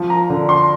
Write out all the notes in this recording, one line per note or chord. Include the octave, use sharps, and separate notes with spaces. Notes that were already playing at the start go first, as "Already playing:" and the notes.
Already playing: F3
A#5
D3
C6